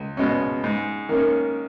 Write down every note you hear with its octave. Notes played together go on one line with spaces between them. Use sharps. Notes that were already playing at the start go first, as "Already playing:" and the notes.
Already playing: C#2
B2 G#3 C#4
G#2
D#3 A#3 C#4